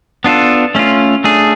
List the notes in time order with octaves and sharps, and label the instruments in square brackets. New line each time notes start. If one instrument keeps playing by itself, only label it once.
[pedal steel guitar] B3 D4 F4 A4
A3 C#4 F4
A3 D4 G#4